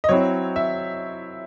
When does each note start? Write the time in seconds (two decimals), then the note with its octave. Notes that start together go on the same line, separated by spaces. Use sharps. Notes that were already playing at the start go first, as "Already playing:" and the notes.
0.04 D#5
0.09 F#3 C4 E4 C#5
0.56 E5